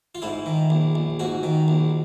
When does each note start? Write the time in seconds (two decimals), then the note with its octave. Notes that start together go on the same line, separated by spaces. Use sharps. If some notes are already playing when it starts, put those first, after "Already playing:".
0.15 F4
0.22 G#2 E4
0.46 D#3
0.70 A#1
0.95 A#1
1.20 G#2 F#4
1.43 D#3
1.68 A#1